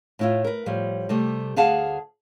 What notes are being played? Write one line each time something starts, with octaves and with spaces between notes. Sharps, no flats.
A2 E4 F4
A#4 B4
A2 F3 G3
C3 G3 A3
D2 G#4 F5 F#5 A5